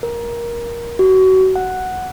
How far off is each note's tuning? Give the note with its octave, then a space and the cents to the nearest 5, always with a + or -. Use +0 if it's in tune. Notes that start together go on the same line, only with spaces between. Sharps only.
A#4 +15
F#4 +30
F#5 +0